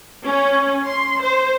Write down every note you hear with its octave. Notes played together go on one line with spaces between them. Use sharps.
C#4
C6
C5